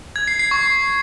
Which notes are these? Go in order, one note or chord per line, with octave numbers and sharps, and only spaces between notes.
G#6
C7
C7
C#6